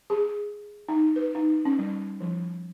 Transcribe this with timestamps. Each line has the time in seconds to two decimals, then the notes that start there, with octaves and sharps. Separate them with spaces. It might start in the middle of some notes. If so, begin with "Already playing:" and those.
0.10 G#4
0.88 D#4
1.16 B4
1.35 D#4
1.65 C#4
1.79 G3
2.21 F3